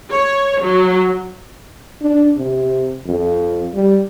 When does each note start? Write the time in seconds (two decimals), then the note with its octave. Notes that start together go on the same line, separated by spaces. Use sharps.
0.12 C#5
0.62 F#3
2.01 D4
2.37 C3
3.06 F2
3.74 G3